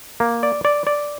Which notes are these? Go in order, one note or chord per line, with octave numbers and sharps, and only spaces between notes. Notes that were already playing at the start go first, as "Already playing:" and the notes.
A#3
D5
D5
D5